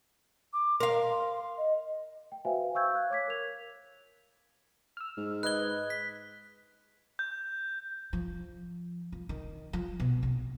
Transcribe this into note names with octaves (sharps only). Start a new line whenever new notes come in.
D6
A#4 F5 C6
D#5
G5
F#4 B4 C5 E5 F5 G#5
F5 C#6 E6 G6 G#6
F5 F#6
C#5 D6 G#6 B6
A#4 F7
E6 F6
G#2
B4 D#5 F#6 G#6 G7
B6
G6
F3
F3
D#3
F3
B2
A#1